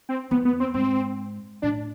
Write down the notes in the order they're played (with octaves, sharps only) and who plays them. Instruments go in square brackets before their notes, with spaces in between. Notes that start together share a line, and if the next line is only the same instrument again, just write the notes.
[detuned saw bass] C4
[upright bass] E2 [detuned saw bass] B3
[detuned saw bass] B3
C4
[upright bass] G#2 [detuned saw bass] C4
[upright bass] A2 [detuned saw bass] D4